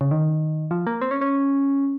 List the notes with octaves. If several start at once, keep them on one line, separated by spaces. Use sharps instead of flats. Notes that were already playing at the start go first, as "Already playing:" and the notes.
C#3
D#3
F3
A#3
C4
C#4
C#4